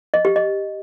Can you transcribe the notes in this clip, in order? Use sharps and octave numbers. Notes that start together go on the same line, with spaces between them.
D#5
G4
D#5